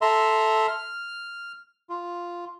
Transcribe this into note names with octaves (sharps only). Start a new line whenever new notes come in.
A4 E5 A#5 C6
F6
F4